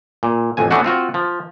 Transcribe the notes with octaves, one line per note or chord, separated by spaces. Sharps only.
A#2
A1 F2 G#5
A3 B3 C#4 D4 F#4 F#5
C4 F4 F#4
F3